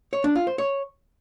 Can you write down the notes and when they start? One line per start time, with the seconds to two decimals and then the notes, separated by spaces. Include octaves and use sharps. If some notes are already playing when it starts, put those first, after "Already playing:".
0.13 C#5
0.24 D4
0.36 F4
0.47 C5
0.58 C#5